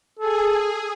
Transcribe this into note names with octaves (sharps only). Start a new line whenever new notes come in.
G#4 A4